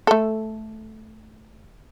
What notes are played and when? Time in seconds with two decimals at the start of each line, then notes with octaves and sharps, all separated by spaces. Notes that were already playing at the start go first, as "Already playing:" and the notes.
0.07 A3 A4